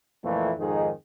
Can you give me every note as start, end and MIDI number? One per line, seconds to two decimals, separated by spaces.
0.23 0.50 41
0.23 0.50 46
0.23 0.50 52
0.23 0.50 57
0.23 0.50 58
0.58 0.89 41
0.58 0.89 44
0.58 0.89 51
0.58 0.89 63
0.58 0.89 68